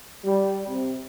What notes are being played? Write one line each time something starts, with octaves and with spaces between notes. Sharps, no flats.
G3
C3